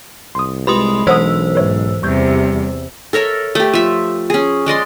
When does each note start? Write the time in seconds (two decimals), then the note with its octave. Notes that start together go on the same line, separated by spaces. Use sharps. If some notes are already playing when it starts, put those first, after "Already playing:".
0.35 C2 C6 D#6
0.67 G#3 F4 G4 B4 B5 C6 D#6
1.07 B1 E3 C5 C#5 F#5 D#6 E6
1.55 G#2 B4 C#5 E5
2.03 E2 C3 G3 C#6 G6 G#6
3.13 A4 A#4 C#5 E5
3.55 A3 G4
3.74 F3 E5
4.30 C#4 G#4
4.66 G#3 D5 D#5 C6